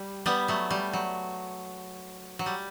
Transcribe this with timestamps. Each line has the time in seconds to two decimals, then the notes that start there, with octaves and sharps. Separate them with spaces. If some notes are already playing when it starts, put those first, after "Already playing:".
Already playing: G3
0.26 G3 B3
0.48 F#3 A3
0.70 G3
0.93 F#3
2.39 F#3
2.46 G3